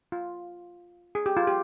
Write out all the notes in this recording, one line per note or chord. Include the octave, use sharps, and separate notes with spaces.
F4
G#4
G4
F4
G4